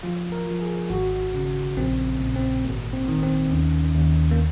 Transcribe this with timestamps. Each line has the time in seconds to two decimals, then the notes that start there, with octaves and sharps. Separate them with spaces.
0.03 F3 F4
0.32 A#4
0.46 F3
0.62 G#4
0.90 G#1 F#4
1.34 C#3
1.77 A#1 C4
2.21 A#2
2.36 C4
2.64 G#1 A#3
2.93 C4
3.08 D#3
3.23 C4
3.51 D#2 C#4
3.95 D#2
4.31 A#3